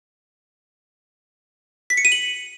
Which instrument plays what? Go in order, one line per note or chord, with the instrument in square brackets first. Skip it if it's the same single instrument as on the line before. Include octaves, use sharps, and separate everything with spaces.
[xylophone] B6
C#7
D#7
F#7